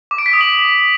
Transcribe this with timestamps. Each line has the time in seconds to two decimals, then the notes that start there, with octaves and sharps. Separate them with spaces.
0.11 D6
0.18 D7
0.26 B6
0.33 D#6
0.41 F#7